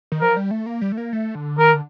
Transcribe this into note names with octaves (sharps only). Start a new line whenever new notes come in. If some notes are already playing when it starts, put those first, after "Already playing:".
D#3
F3 A#4
G3
A3
A#3
G3
A3
A#3
A3
D3
D#3 A#4
D3